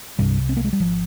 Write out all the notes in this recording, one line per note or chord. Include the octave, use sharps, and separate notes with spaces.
C2 G2 C3 G3
C4
A#3
G#3
G3
G#1 F3